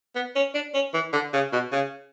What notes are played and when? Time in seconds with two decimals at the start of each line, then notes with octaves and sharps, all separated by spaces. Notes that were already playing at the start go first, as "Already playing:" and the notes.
0.15 B3
0.35 C#4
0.54 D4
0.74 C#4
0.94 E3
1.13 D3
1.33 C#3
1.53 B2
1.72 C#3